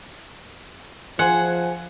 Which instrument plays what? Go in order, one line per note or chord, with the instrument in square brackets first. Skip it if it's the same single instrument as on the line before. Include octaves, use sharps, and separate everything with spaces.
[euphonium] F3 [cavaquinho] G#4 C5 G#5 [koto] F#5